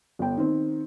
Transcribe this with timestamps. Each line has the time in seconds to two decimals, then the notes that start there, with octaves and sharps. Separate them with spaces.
0.19 G1 G5
0.37 D#3 C4